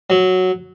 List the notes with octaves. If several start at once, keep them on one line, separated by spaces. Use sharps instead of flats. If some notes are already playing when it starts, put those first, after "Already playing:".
F#3